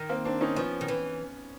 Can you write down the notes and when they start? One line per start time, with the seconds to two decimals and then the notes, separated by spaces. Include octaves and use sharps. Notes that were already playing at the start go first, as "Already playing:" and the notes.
Already playing: D#3
0.09 A#3 C4
0.25 C4 D4
0.41 C#4 D#4
0.56 F3 B3 C#4
0.81 D#3
0.88 E3